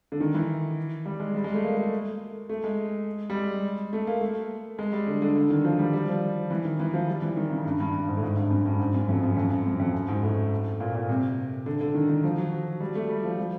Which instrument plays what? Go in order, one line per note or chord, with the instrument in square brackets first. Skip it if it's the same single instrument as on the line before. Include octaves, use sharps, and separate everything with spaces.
[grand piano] D3
D#3
E3
G3
G#3
G3
G#3
A3
A#3
A3
A3
G#3
G3
G#3
A3
A#3
A3
G#3
G3
D3
D3
D3
D#3
F3
G3
G3
F3
E3
D#3
E3
F3
G3
E3
D#3
C#3
G2
G2
G2
G#2
A2
G#2
G2
F#2
G2
G#2
F#2
F2
F#2
F2
F#2
F#2
F2
F#2
G#2
A2
A#2
A#2
C3
D3
D3
D#3
D#3
F3
F#3
G3
A3
G3
F3
F3